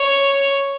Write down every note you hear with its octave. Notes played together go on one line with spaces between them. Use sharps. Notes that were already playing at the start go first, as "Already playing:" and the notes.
Already playing: C#5